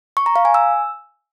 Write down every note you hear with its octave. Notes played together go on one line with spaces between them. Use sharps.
C#6
A#5
F5
G#5
E6